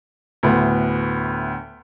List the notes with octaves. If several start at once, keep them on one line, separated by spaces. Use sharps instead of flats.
D2 A2 B3